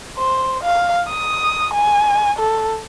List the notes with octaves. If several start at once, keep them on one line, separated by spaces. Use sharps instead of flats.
C5
F5
D#6
G#5
A4